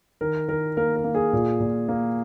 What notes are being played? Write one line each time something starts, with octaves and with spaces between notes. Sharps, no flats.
D#3 A#4
D#3 A#4
A#3 A#4
A#4
A#3
G#4
A#2
A#2
A#3